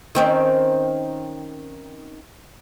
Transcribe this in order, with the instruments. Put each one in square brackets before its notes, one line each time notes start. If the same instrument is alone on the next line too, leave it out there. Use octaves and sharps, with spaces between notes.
[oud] D#3 C4 C#4